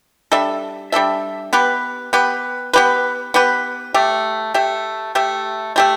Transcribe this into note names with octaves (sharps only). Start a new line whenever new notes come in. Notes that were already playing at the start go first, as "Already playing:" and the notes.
G3 D4 A4 E5
G3 D4 A4 E5
B3 G4 B4
B3 G4 B4
B3 G4 B4
B3 G4 B4
A3 G4 E5
A3 G4 E5
A3 G4 E5
A3 G4 E5